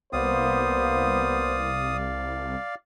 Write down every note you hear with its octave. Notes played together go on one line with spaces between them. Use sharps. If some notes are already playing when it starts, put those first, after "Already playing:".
C2 A#3 B3 C5 D5 F5 D#6